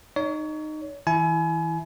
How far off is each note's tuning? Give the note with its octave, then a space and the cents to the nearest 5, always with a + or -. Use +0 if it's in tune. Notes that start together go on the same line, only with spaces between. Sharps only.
D#4 -15 C#5 +30
E3 -30 E4 +0 G#5 +30